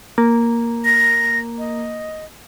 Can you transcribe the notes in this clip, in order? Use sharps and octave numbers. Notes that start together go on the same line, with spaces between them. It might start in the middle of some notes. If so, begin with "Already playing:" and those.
A#3
A#6
D#5